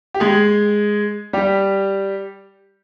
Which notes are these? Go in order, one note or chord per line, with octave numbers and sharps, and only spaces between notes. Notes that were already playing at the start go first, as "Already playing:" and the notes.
G4
G#3 G#4
G3 G4